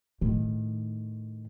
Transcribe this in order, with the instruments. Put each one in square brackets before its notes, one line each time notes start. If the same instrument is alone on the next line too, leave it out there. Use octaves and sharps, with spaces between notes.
[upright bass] A2 D#3